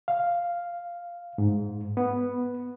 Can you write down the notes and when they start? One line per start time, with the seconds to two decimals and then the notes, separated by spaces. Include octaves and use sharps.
0.08 F5
1.38 G#2
1.97 B3